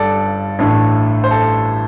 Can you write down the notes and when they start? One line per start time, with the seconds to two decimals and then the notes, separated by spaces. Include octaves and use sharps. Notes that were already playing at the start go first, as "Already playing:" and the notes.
Already playing: G1 G2 A4 D5
0.59 A1 A2 A3 D4
1.24 C5
1.31 A4